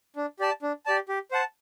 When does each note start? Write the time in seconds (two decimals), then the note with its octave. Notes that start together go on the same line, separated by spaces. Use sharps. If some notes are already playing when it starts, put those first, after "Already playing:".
0.16 D4
0.40 G4 D5 A5
0.62 D4
0.86 G4 D5 A5
1.09 G4
1.31 C5 F#5 A5